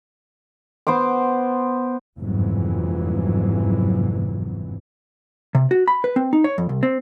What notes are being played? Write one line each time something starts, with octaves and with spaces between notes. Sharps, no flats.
B3 C5 C6 D6
G1 F2 G#2 C3 E3 F#3
C3
F#4
B5
B4
C4
D#4
C#5
F2
C2
C4